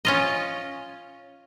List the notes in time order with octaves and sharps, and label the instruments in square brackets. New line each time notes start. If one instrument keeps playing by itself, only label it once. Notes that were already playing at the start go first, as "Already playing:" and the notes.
[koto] C#4 F4 D#5